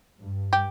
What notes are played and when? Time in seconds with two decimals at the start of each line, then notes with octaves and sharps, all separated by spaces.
0.21 G2
0.53 G4